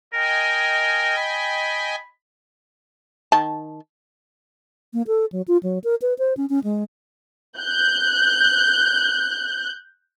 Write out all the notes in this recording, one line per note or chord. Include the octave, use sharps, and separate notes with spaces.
A#4 D#5 G5 G#5
B5
D#3 A5
A#3
A4
F#3
F4
F#3
A#4
B4
C5
C#4
C#4
G#3
F#6 G6